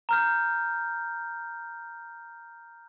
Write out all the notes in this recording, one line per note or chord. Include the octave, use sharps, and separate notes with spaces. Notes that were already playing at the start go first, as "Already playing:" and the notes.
A#5 F6 G6